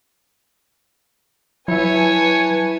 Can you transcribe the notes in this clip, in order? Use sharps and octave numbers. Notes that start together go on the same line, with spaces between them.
F#3 E4 B4 C#5 E5 G#5 A5